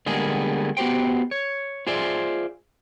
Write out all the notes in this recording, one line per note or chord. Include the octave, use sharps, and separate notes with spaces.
D3 G3 G#3 A#3 B3 G#4
B3 F#4 G4 C5 G5
C#5
F4 G#4 C5 D5 E5